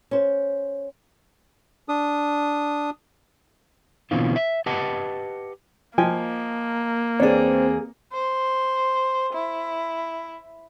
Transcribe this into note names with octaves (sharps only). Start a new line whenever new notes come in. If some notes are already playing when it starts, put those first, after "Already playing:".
C#4 C5
D4 D#6
B2 D3 E3 A#3 C4 F4
E5
G4 B4 D#5 F#5 A5
F3 A#3 D#5 G5 G#5
E2 C4 D4 G#4 C#5
C5
E4